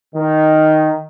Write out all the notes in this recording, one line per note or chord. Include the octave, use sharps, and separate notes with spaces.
D#3